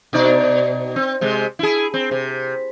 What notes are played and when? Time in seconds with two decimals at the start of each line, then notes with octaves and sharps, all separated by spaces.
0.13 B2 D#4 D5
0.96 C4
1.21 C3 G#3
1.59 E4 G#4
1.94 C4
2.11 C3